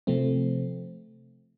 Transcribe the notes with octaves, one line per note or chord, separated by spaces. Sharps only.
C3 F3 A3 C4